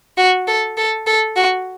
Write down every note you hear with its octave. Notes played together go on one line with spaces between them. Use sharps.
F#4
A4
A4
A4
F#4